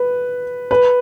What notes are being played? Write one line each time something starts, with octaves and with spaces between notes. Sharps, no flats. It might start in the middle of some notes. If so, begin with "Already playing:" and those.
Already playing: B4
B4